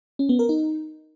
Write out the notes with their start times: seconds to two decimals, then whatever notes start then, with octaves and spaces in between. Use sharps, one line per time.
0.19 C#4
0.29 B3
0.39 A#4
0.49 D#4